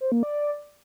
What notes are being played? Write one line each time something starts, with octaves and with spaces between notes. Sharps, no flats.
C5
A#3
D5